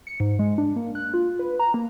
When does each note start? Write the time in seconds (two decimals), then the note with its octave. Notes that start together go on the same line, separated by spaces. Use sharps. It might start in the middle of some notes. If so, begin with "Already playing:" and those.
0.07 C#7
0.20 G#2
0.39 G#3
0.58 D4
0.76 A#3
0.95 F#6
1.14 F4
1.39 B4
1.60 A#5
1.74 A#3